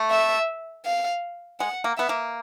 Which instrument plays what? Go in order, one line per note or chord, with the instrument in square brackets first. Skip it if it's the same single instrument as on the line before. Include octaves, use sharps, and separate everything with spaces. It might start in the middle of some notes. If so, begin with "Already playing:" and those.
Already playing: [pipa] A3
[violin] E5
F5
[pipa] G#3 [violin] F#5
[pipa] A#3
[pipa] B3 [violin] E5
[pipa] A#3